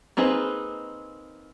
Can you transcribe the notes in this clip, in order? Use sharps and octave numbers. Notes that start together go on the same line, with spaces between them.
A#3 C4 D#4 G#4 B4